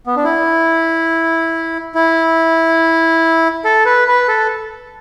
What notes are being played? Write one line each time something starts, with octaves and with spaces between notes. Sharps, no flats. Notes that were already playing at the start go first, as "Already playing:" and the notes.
B3
D4
E4
E4
A4
B4
B4
A4